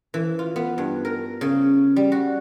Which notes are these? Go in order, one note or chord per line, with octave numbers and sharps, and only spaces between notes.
E3
F4
B3
G2
A#4
C#3
G3
F#4